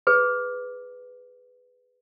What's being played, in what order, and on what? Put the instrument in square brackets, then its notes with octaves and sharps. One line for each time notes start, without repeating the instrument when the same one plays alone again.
[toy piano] G#4 B4